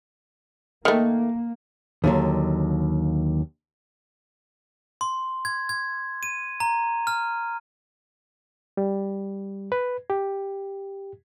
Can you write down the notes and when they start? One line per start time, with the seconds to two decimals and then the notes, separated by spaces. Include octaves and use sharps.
0.85 D#3 A3 A#3
2.04 D#2 D3 F#3
5.01 C6
5.45 G#6
5.69 G#6
6.23 D#7
6.60 A#5
7.07 F6
8.77 G3
9.72 B4
10.10 G4